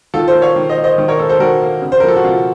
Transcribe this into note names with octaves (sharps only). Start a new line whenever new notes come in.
D#3 F4 A4
A4 C5
A#3
C#5 F5
D#3
C5 D#5
A#3
C5 D#5
D#3
A#4 C#5
A#3 A4 C5
A4 C5
D#3 F#4 A#4
A#3
C#3
C5
A#4
F3 A#3 A4
F#4
C#3 F4